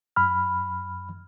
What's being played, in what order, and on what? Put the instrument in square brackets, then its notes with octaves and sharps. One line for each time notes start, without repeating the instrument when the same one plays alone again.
[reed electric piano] F#2 B5 F6